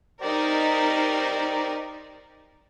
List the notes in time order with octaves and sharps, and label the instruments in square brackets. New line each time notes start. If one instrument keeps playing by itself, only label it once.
[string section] D#4 A#4 [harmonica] G4 C5 D5